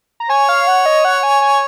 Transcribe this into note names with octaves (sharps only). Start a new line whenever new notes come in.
A#5
C#5 G#5
F5
F#5
D#5
F#5
G#5
G#5